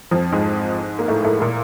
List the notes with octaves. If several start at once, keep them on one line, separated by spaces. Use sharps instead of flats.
F2 F3
G#2 G#3
A#3
A2 A3
A2 A3
A#2 A#3